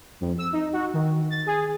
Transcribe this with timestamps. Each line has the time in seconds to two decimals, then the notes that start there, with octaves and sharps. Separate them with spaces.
0.21 F2
0.38 E6
0.53 D#4
0.73 F#4
0.94 D#3
1.30 A6
1.46 G#4